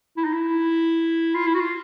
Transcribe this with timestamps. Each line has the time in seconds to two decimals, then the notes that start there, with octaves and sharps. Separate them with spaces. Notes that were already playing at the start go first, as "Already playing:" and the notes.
0.17 E4
0.24 D#4
0.33 E4
1.35 F4
1.47 E4
1.54 F#4
1.60 F4